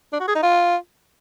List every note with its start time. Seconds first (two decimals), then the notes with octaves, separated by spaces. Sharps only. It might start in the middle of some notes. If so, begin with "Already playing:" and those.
0.13 D4
0.20 F#4
0.28 G#4
0.35 D#4
0.43 F4